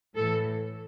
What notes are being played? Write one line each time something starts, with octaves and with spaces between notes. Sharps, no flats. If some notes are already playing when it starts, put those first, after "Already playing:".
A2 E3 A4